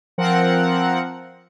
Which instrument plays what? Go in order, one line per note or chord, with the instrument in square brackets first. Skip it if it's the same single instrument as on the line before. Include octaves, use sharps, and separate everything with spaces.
[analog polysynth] F3 C4 A#4 F#5